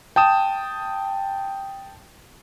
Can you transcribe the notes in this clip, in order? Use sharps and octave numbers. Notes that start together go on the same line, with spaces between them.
G5 A5 D#6 E7